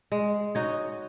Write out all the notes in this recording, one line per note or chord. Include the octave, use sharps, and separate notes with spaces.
G#3
D#4 F#4 C#5